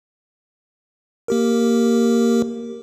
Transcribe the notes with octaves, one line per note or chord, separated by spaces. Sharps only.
A#3 G4 A#4